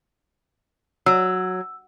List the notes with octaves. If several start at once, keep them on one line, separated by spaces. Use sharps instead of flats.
F#3 E6